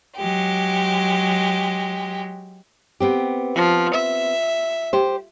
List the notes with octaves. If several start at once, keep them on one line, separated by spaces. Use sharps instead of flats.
F#3 G#3 G4
B3 C4 G4
F3
E5
G4 C5